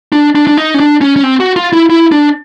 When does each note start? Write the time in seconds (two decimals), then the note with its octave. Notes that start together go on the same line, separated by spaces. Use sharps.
0.12 D4
0.35 D4
0.47 D4
0.57 D#4
0.74 C#4
0.80 D4
1.01 C#4
1.16 C#4
1.23 C4
1.40 F#4
1.56 F4
1.73 E4
1.90 E4
2.12 D4